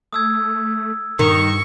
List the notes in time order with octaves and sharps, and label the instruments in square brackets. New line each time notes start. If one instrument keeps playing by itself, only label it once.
[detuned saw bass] A3 [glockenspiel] D#6 E6 G#6
[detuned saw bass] G2 [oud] D#3 [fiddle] C#6